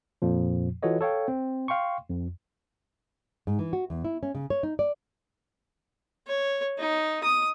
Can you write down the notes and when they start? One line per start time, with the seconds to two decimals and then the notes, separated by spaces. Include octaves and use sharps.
0.22 F2 A#2 F3
0.83 E3 F4 F#4 A4 C#5 D#5
1.01 A4 C#5 F5 G5
1.28 C4
1.68 F5 G5 C6 C#6
2.09 F2
3.47 G#2
3.59 E3
3.73 F#4
3.90 E2
4.05 E4
4.23 C#4
4.35 C#3
4.50 C#5
4.63 D#4
4.79 D5
6.27 C#5
6.79 D#4
7.24 D#6